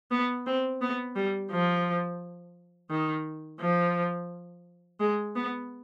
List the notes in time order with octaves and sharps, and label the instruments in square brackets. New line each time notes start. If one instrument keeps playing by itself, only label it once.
[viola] B3
C4
B3
G3
F3
D#3
F3
G#3
B3